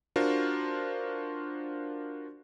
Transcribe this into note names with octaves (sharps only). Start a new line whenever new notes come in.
D4 F4 F#4 A#4 C5